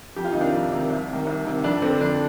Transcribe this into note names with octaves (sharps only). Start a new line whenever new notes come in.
F2 G4
F4
C3 D#3 D#4
D4 F4
F2
C3 D#3
C2
C3 D#3
C2
C3 D#3
F2 D4
D3 C4
F2 D4